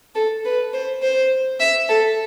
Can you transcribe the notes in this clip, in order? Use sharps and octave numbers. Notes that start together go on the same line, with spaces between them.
A4
B4
C5
C5
E5
A4